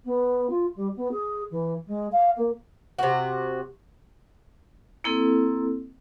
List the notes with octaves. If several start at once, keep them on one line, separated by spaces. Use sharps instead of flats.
B3
F4
G3
B3
G#4
E3
G#3
F5
A#3
C3 F#4
A#3 C4 E4 A4